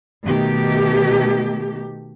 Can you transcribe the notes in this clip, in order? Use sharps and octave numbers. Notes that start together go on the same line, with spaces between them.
B2 D#3 A3 G4